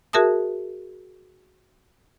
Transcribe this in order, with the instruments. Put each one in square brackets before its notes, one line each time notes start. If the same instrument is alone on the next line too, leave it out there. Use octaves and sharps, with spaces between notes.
[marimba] F#4 G#4 A#4 E5 A5 D#6